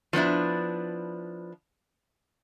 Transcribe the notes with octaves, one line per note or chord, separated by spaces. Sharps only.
F3 B3 D4 E4